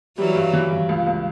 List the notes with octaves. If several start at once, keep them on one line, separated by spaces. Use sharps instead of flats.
E3 F#3 G3
G2
E3
G2
C#2
C#2